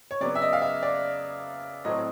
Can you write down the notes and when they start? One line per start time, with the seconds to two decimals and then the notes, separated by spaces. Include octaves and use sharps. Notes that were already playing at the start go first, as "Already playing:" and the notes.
0.11 C#5
0.20 C#3 F#3 B3 D5
0.35 E5
0.42 D#5
0.53 F5
0.62 E5
0.83 D5
1.85 A2 F#3 A3 C4 D#5